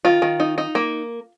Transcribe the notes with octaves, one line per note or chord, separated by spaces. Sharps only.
D#3 F4
D#3
D#4
D#4
A#3